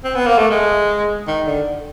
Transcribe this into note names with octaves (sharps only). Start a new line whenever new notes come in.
C4
B3
A#3
A3
G#3
D#3
D3